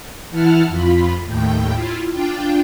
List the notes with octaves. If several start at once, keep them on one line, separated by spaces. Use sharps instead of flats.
E3 E4 F#5 A5 F6
F2 F4 B5
D#2 A2 G5
E4 F4
D4 F4 G5